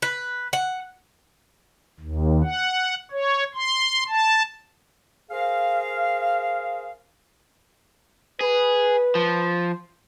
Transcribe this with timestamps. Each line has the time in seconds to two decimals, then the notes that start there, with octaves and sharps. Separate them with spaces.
0.02 B4
0.53 F#5
2.00 D#2
2.44 F#5
3.11 C#5
3.55 C6
4.08 A5
5.31 G#4 A#4 C5 F5
8.41 G#4 B4
9.15 F3